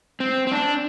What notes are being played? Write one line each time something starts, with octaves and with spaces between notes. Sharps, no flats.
C4
C4
D4